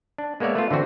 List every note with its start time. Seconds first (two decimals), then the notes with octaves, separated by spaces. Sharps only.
0.18 D4
0.40 G#3 A#3 B3 C#5 D5 E5
0.55 A3 B3 F4
0.71 D3 E3 C4 F#4